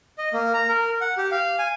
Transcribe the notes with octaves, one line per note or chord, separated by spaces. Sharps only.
D#5
A#3
A#5
A#4
F#5
G4
F5
G#5